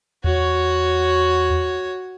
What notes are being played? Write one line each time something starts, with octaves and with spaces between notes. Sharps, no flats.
E2 F#4 C#5